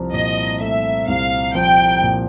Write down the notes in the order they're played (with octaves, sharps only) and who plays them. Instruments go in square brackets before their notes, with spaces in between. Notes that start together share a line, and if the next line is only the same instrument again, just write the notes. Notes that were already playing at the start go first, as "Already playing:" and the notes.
Already playing: [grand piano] C2 F3
[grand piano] A#2 [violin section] D#5
[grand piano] A3 [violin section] E5
[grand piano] C2 [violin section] F5
[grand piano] F3 [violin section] G5
[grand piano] A#2